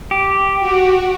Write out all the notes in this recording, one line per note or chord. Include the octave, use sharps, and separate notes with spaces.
G4
F#4